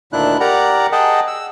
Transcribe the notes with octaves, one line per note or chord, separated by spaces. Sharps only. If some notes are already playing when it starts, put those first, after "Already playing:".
D2 A#2 D#3 D4 E4 F#6
G4 A#4 D5 F#5 A#5
G#4 D#5 F#5 G5 A5
E6